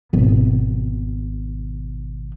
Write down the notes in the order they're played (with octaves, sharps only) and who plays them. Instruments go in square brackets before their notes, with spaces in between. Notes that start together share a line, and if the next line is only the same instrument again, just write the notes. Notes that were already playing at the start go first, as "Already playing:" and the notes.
[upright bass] G#1 B2